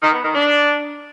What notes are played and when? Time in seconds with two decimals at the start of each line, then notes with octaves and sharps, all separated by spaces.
0.02 D#3
0.13 B3
0.24 D#3
0.35 D4